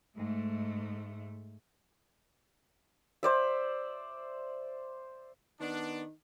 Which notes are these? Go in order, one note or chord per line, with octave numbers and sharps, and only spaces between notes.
G#2 A3
C5 D5 E5
D#3 B3 D4